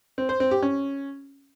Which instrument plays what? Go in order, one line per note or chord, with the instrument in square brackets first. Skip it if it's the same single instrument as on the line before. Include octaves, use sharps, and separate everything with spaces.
[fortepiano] C4
C5
C4
G4
C#4